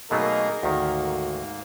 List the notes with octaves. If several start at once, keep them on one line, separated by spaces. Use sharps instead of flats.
B2 F#3 A3 A#3 D#4 G#4 A#4
D2 G#2 D#3 A#3 F#4